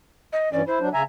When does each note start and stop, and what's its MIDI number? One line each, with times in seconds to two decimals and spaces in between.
0.33 0.52 75
0.53 0.62 43
0.53 0.62 52
0.53 0.62 61
0.53 0.66 74
0.67 0.79 64
0.67 0.88 72
0.80 0.89 54
0.80 0.89 62
0.93 1.03 49
0.93 1.03 76
0.93 1.03 80
0.93 1.04 82